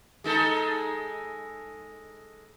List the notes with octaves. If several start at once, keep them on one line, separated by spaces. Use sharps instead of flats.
G#3 D#4 A4